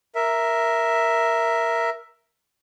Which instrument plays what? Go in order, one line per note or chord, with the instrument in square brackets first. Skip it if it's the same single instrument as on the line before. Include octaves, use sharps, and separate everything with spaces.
[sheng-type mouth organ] A#4 E5